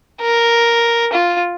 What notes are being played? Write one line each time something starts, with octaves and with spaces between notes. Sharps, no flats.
A#4
F4